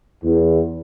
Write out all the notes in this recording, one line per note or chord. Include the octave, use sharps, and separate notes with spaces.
E2